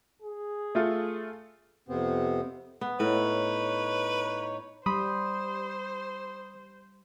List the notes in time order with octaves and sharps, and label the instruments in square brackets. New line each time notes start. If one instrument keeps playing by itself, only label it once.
[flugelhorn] G#4
[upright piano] A3 F4 A4
[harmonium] F2 C3 B3 C4
[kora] B3
[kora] A2 [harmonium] D#4 C#5 [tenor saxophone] B4
[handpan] G3 [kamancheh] C5 [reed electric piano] B5 C6 D#6